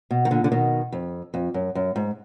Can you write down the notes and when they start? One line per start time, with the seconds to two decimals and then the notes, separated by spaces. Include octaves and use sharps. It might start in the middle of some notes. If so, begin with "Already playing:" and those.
0.11 B2
0.25 D#3
0.31 A#2 D3
0.44 D3
0.52 B2 D#3
0.92 F2
1.34 F2
1.54 F#2
1.75 F#2
1.96 G#2